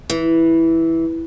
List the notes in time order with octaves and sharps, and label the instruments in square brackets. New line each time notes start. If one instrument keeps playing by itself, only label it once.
[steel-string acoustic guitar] E3